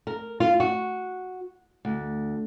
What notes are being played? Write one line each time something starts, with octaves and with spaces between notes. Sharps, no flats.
A#4
F4
F#4
D2